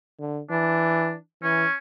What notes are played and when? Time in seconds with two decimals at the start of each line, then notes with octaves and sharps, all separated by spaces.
0.20 D3
0.50 E3 D4
1.43 E3 C#4